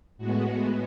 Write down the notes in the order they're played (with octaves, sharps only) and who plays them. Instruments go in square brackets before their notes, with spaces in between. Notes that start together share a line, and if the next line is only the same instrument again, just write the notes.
[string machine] A2 G#3 B3 F#4